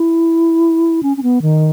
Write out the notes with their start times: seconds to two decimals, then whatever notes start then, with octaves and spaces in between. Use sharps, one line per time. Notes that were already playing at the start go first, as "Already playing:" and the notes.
Already playing: E4
1.03 C#4
1.17 C#4
1.23 B3
1.42 D#3